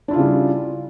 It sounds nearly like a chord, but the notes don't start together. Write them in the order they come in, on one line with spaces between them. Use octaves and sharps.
D4 E4 F4 C#3 G3